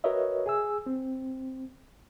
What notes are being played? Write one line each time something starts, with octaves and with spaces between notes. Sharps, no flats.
F#4 A#4 B4 C#5 D#5 E5
G#4 G#5 E6
C4